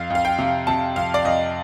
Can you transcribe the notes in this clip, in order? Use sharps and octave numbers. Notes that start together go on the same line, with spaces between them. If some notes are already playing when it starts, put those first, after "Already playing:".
Already playing: F2 F5
F2 F5
G5
C3
C3 A5
F2 F5
D5
F2 D#5